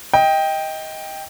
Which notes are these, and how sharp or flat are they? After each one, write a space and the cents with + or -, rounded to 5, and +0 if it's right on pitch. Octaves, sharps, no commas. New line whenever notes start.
D#5 +20 G5 +5